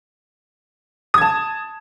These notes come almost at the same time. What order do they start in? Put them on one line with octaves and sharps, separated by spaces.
D#6 G#6 A5